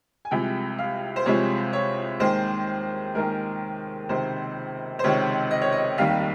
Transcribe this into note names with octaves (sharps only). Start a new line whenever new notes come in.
G#5
C2 C3 F3 G#3 G5
F5
C5
C2 C3 F3 G#3 C#5
C#5
D#2 D#3 G#3 C5
D#2 D#3 G#3 A#4
C#2 C3 D#3 C5
C5
C#2 C3 D#3 C#5
D#5
C#5
D#5
F1 D#2 D#3 G3 F5